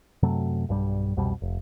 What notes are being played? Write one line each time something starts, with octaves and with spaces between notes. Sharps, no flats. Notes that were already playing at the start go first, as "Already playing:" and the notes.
F#2 C3 F#3 A3
B1 G2 D#3 G3
C2 F2 B2 G3
F1